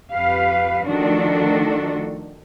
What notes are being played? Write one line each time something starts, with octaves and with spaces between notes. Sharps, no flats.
F2 G4 B4 F5
D#3 F3 A3 D4 F#4 A4